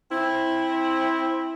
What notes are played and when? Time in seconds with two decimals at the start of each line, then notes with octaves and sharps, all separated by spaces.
0.11 C4 E4